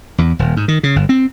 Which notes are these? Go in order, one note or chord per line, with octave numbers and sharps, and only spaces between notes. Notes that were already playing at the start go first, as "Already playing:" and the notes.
E2
D#1
G#2
D#3
C#3
G1
C4